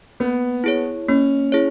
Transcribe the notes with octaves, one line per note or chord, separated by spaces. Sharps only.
A#3 B3
E4 G#4 C#5
A#3 C#4
E4 G#4 C#5